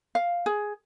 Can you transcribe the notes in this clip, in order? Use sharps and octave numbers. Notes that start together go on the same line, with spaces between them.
F5
G#4